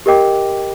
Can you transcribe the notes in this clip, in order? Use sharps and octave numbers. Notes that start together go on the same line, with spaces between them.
G4 A#4 D#5 G5 D6